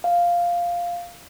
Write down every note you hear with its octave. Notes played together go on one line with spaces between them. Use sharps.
F5